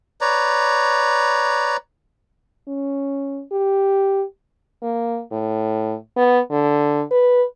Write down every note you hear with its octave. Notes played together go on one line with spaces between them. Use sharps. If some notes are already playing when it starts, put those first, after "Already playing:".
B4 C#5 D5 A#5
C#4
G4
A#3
A2
B3
D3
B4